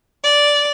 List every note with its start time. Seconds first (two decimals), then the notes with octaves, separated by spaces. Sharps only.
0.24 D5